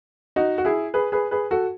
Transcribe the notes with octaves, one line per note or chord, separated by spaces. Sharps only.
D#4 F#4
F#4
E4 G#4
G#4 B4
G#4 B4
G#4 B4
F#4 A4